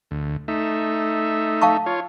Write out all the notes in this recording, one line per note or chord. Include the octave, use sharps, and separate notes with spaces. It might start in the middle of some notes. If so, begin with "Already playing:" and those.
D2
A3 D#4 E5
F5 A5 C#6
F4 C#5